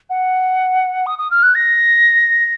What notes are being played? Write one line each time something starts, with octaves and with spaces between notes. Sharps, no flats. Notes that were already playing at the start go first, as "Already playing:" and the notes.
F#5
D#6
D#6
F6
F#6
A#6